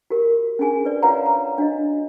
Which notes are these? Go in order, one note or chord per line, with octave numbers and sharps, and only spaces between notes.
F#4 G4 A#4
C#4 D4 F#4 G#4 G#5
B4 D5
F4 B4 C#5 F5 F#5 A#5
A#5
D4 F#4 D#5